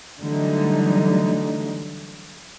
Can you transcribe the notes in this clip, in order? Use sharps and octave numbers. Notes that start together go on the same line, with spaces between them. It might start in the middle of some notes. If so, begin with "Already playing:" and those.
D3 E3 F#3 G3 A3 D#4